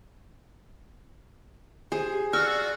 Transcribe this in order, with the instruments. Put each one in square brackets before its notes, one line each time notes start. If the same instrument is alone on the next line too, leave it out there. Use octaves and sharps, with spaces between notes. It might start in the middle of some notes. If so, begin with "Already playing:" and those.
[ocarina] G4 [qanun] G#4 [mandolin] C5
[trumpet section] F4 F#4 [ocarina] D5 [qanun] C#6 [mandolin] E6 F6